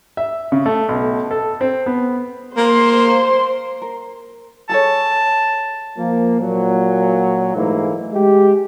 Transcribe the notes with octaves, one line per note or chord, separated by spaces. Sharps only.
E5
C#3
A3
B1
A4
C4
B3
A#3 C5 C6
A#4
G#4 A4 C#5 A5
F3 A#3
A#2 F#3
G#2 E3 A3 A#3 E4
G#3 G4